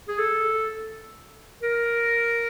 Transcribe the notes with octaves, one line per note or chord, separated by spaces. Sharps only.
G#4
A4
A#4